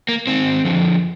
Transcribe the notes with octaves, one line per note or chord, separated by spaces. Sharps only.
A#3
G#2 D#3 C4
F2 D3 F3